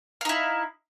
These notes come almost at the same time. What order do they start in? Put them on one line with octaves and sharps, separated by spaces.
F5 D#4 E4